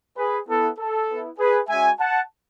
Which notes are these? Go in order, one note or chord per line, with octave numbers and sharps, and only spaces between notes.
G#4 B4
B3 E4 A4
A4
B3 E4
G#4 B4
G#3 C#4 F#4 E5 G#5
F#5 A5